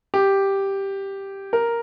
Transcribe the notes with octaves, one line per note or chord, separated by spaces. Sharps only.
G4
A#4